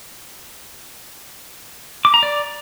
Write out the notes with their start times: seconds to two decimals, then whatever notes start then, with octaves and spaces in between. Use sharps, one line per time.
2.05 D6
2.14 A#5
2.23 D5